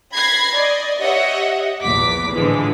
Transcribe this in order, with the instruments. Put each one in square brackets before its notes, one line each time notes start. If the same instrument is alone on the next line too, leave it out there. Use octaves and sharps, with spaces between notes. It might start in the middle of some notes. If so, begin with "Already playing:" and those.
[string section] B5 G#6 A#6 C7
D5 D#5
G4 C#5 D#5 E5 F#5
A#1 E2 D6 B6
A2 D3 E3 F3 G#3